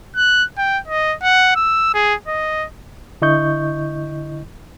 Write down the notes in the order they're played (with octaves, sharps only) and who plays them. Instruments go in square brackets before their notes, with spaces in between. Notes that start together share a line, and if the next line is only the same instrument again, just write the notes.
[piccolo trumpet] F#6
G5
D#5
F#5
E6
G#4
D#5
[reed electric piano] D3 E4 D#5 C#6 G6